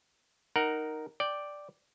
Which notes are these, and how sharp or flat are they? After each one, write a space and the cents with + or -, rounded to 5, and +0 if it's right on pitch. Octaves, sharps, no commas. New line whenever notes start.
D#4 +0 A#4 +0 F#5 +15
D5 +0 G5 +0